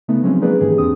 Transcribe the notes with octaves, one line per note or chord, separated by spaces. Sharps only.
C#3 A3 B3 D#4
F3 F#3 G#3 C4 C#4 D#4
F#3 A#3 D#4 G#4 B4 D5
G#2 D#3 E3 G4 G#4
E2 C4 D4 D#6